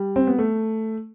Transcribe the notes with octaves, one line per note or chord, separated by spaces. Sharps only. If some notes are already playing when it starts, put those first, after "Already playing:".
Already playing: G3
C4
B3
A3